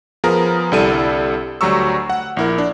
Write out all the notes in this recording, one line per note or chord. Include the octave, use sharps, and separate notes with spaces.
F3 B3 G#4 A#4 A#5
C2 D3 G3 E4 A4 D#7
D2 F#3 G3 A#5 C#6 E6
F#5
A#1 E4 A#4
D4